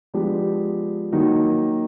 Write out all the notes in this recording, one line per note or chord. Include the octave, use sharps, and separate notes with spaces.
F3 G#3 B3 D4 G4
D#3 F#3 A#3 D#4 F#4